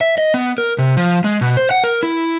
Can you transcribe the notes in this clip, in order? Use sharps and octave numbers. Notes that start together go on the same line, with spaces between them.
E5
D#5
B3
A#4
C3
F3
G#3
B2
C5
F#5
A#4
E4